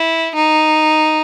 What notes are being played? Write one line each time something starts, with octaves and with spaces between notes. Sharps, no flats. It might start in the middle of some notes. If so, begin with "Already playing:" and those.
Already playing: E4
D#4